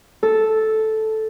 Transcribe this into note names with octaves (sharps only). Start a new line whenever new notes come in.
A4